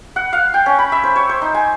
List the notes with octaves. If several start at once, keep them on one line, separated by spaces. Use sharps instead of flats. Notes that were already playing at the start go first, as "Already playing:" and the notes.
F#5
F5
G5
C#4
B5
E5
C5
C#5
C5
D#4
G#5